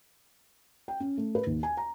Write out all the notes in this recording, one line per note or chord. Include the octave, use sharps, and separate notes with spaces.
G5
C#4
A3
B4
D#2
G#5
A#5